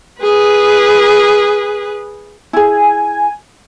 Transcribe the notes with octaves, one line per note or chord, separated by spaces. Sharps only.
G#4 B4
E4 G#4 G#5